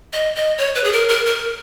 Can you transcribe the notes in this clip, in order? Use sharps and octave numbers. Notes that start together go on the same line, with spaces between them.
D#5
D#5
C#5
B4
G#4
A#4
A#4
A#4